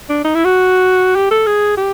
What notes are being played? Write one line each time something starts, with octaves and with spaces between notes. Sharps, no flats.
D4
D#4
E4
F#4
G4
A4
G#4
G4